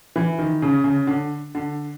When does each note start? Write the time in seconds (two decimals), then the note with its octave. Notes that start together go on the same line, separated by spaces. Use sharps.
0.16 E3
0.39 D#3
0.62 C#3
0.84 C#3
1.07 D3
1.55 D3